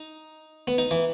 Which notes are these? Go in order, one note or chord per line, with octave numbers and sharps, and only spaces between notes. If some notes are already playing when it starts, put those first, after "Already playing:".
Already playing: D#4
B3
D#4
E3